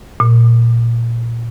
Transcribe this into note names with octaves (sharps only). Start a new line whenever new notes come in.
A#2